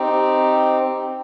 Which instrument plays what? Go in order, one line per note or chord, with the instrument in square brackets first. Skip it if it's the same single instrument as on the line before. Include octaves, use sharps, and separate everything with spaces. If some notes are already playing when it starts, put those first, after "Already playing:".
Already playing: [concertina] C4 D#4 G4